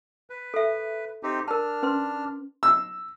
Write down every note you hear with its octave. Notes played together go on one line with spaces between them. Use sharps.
B4
A4 E5
C4 D#4 G4
D4 A#4 A5 F6
C#4 B4 C6
E6